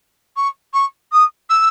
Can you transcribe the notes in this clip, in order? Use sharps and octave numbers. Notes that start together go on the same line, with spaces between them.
C#6
C#6
D#6
E6